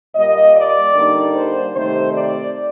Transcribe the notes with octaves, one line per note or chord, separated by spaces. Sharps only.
A#2 G3 A#3 D#5
D5
D3 G3 A#3 D#4
C5
C3 D#3 A3 D#4 C5
D5